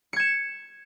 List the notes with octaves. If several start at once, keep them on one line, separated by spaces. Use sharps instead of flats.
G#6 C#7 E7